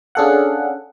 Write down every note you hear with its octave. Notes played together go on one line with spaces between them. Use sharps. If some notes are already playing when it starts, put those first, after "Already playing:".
C#4 D4 G#4 A4 F5 F#5